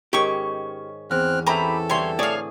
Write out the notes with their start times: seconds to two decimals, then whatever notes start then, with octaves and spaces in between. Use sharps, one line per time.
0.13 G#2 D#3 C#4 G4 C#5 C#6
1.11 E2 C4 F6 F#6
1.47 E3 C4 C#4 G4 A4 A#5 B5
1.90 D3 E3 G3 C#5 C6
2.19 A2 G#4 C#5 D5 F5